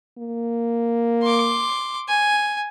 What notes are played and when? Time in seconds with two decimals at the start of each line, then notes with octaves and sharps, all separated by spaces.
0.18 A#3
1.22 C6 D6
2.09 G#5